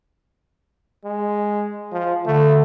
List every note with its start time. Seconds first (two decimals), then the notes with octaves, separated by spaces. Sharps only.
1.04 G#3
1.92 F3
2.26 D3 A3